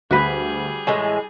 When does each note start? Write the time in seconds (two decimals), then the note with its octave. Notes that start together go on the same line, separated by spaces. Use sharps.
0.11 D2 G3 F#4 G#4 B4
0.87 A2 E3 G#3 G#5